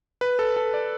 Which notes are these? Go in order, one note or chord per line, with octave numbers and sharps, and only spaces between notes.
B4
A4
A4
D5